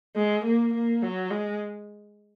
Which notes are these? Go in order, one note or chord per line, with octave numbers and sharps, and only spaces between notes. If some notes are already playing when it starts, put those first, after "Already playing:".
G#3
A#3
A#3
F#3
G#3